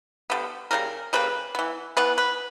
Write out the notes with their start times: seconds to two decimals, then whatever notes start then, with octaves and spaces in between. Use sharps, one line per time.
0.30 D3 G3 B3
0.71 C#3 G3 A#3 A#4
1.13 C#3 G3 A#3 B4
1.55 E3 B3
1.97 E3 B3 B4
2.18 B4